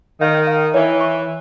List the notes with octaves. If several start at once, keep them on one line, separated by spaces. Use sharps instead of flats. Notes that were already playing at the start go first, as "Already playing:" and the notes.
D#3 F5
F5
E3 C#5
C#6